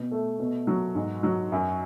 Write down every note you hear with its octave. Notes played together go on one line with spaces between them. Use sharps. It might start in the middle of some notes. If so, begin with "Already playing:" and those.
Already playing: B2
A3
B2
F#3
G#2
F#3
F#2